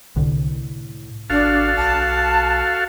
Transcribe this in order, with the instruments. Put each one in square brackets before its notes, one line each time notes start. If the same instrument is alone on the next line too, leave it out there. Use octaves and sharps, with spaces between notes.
[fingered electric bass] C2 D3 [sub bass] A2
[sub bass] G#1 [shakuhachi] D4 [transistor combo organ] F#4 A4 F5
[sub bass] B1 [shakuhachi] A5